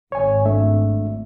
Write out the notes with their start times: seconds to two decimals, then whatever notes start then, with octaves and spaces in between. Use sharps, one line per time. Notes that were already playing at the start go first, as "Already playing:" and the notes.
0.12 G#1 C#5 G#5
0.45 A3 D4 E5